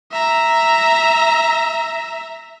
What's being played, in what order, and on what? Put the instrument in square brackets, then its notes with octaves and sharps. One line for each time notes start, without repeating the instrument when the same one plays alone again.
[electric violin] E5 A#5